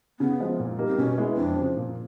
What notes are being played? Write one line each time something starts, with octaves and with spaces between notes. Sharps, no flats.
C#3 B3
F3 G#3
A#2
G3 A#3 D#4
C4
B2 C#4
G#3 B3 E4
F2 D4
C#3 F3
A#2